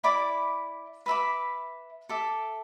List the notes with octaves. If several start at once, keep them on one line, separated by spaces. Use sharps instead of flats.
E4 D5 B5 D6
B4 E5 B5 D6
A4 E5 D6